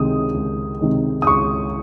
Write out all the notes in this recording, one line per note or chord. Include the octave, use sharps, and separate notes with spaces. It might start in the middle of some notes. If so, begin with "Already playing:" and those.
Already playing: C#2 C3 D#3 G#3 D#6
C#2
C3 D#3 G#3
D#6
C#2 C#6